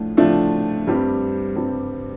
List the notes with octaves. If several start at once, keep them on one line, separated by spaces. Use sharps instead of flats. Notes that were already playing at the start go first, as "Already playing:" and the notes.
Already playing: A2 F3 A3 D4 F4
A2 F3 A3 D4 F4
G2 G3 C4 G4
G2 G3 C4 G4